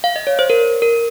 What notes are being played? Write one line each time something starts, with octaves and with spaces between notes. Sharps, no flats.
F5
D#5
C#5
C5
A#4
A#4